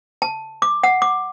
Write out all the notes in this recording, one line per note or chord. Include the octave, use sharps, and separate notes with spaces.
A5
D6
F#5
D6